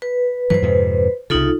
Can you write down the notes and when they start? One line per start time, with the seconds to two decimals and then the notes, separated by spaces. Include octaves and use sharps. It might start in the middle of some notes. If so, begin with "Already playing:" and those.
0.02 B4
0.50 G2 E3 F#3 B4 C5
0.62 F2 G#2 C3
1.30 C2 C#3 D#4 F4 A4